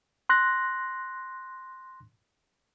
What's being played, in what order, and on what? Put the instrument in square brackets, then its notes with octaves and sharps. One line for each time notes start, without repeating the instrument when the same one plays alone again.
[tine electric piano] C6 F#6 A#6